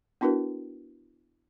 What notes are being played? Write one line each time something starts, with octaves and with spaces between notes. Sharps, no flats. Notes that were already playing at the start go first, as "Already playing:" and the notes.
B3 D4 E4 F#4 A#4 B4